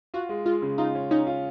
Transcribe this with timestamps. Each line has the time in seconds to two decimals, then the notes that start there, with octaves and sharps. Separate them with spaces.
0.14 F4 F#4
0.29 G#3
0.46 G#3 F4
0.62 C#3
0.78 D#4 F4
0.95 C#4
1.11 C#4 D#4
1.27 F4